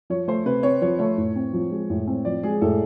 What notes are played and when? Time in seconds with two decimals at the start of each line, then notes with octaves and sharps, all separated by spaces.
0.10 F3 C#5
0.28 A3 C5
0.46 C3 B4
0.63 C4 C#5
0.82 F3 C#5
0.99 A3 C#5
1.17 A2
1.36 C4
1.53 F3
1.71 G#3
1.90 A2
2.07 C4
2.25 F3 D5
2.43 G#3 G#4
2.61 A2 A4